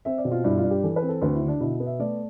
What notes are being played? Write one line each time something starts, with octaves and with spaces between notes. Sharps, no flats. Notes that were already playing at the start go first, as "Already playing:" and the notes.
C4 E5
D5
B2
F4
G2 E4
F4
G2
G4
E3 A4
B4
C4
A4
D2 B4
E4
D3
D4
B2 E4
B3
E5
A3 D5